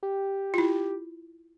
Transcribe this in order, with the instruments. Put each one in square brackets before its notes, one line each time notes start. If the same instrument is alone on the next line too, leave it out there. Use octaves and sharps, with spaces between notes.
[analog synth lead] G4
[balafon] E4 F4